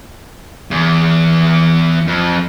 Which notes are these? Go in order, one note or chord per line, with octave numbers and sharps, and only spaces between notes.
E2
F2